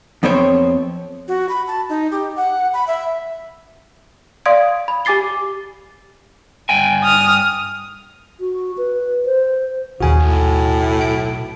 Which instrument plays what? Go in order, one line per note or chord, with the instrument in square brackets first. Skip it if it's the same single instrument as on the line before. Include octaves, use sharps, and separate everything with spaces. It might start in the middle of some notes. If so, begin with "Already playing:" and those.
[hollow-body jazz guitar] F2 B3 C4 C5 C#5
[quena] F#4
B5
A5
D#4
G4
F#5
B5
E5
[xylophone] D5 F5 C6 D#6 G#6 D7
B5
G4 G#5 D6 A6 C7 G7
[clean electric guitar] G2 G5 G#5
[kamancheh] D#6 F6
[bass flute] F#4
B4
C5
[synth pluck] A#1 D#2 [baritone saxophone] C#3 [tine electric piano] F#4 G#5
[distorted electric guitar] B1 [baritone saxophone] A2
[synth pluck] D7